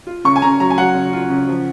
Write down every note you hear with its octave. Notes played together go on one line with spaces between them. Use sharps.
F4
C#3 C#6
G#5
C#3 A#5
F#3 A#5
G#5
F#3 F#5
C#3
F4
C#3
F3